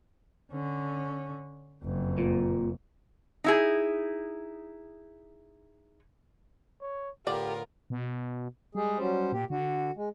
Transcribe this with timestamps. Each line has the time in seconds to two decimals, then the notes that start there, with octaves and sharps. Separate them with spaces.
0.52 D3 C#4
1.83 F#1 F2
2.18 A#2
3.44 D#4 E4 G#4
6.81 C#5
7.27 A2 D3 B3 F4 G4 A#4 D5
7.90 B2
8.75 G3 G#3 G#4
8.99 F#3 C#4 C5
9.32 A#2 G4
9.50 D3 F#4
9.96 G#3